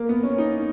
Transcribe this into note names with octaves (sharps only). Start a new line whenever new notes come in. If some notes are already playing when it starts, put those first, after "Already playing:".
Already playing: A#3
B3
C#4
D#4